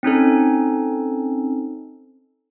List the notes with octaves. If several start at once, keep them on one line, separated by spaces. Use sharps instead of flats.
C4 C#4 D#4 A4